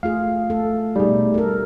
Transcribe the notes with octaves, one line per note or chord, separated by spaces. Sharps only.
A3 F4 G#4 F5
A3 A4
B2 G3 A3 D#4 G#4
A4 A#4